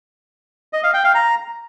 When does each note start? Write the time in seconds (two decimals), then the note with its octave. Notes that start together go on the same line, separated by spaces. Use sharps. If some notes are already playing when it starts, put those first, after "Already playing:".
0.73 D#5
0.83 F5
0.94 G5
1.04 F5
1.15 A#5